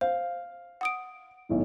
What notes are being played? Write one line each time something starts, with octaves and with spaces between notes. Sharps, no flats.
C5 F5
F#5 D#6 D7
B1 A2 D#3